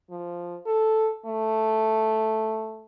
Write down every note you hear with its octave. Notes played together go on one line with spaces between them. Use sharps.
F3
A4
A3